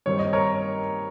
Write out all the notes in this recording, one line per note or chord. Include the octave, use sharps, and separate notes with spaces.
G2 D#3 G3 C4 D#4 C#5
D#5
A#4 C#5